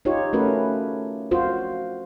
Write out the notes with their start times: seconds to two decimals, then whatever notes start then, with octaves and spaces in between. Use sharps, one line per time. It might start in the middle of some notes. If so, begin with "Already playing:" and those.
0.05 D#4 F4 G4 C#5
0.33 A3 C#4 F#4 A#4 B4
1.31 F4 F#4 C5